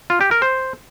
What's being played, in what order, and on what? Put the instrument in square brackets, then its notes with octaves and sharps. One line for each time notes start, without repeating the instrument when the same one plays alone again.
[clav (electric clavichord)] F4
G4
A#4
C5